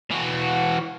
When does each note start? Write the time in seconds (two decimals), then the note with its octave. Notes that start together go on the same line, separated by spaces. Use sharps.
0.11 E3 F#4